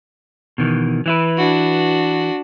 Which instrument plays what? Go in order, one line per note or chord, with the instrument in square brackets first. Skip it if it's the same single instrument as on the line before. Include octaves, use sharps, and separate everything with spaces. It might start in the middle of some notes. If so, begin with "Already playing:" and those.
[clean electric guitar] B2 D#3 E3
E3 E4 B4
[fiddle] D4 F#4